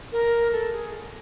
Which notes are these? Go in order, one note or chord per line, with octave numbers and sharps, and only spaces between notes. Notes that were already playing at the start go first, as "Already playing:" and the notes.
A#4
A4
G#4